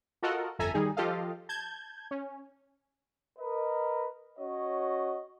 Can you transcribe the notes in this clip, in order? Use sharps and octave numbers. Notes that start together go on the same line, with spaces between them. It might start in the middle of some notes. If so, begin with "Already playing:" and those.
F4 F#4 A4 A#4 D#5 F#5
G1 F2 A4 E5 G#5 A#5
D#3 G3 D#4 G#4
F3 F4 G4 A4 D#5 F5
A5 G6 G#6
C#4
A#4 B4 D#5
C#4 F#4 C#5 D#5